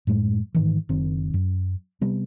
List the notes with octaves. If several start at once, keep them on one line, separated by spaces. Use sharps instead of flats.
F#2 A2 G#3
G#2 D#3 E3
F#1 D#3 C4
F#2
C3 G3 B3